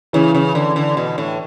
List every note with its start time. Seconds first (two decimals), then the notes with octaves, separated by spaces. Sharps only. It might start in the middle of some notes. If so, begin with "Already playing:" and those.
0.13 C#3 E3
0.34 C#3
0.55 D3
0.76 D3
0.97 B2
1.18 A2